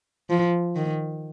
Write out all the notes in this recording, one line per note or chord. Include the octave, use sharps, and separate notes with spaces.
F3
D#3